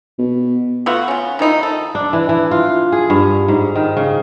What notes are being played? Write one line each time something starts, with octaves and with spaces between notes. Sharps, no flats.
B2
A3 B3 F4 F#4
C#4 F4
D#3 F3 D#4 E4
A4
D4
E3
E3
F4
G#4
G2
G#2
D#3
C#3